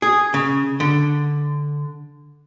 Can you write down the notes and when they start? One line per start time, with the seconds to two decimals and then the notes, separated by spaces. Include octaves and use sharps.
0.02 G#4
0.34 C#3
0.80 D3